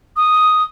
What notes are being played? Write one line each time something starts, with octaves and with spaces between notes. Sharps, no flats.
D#6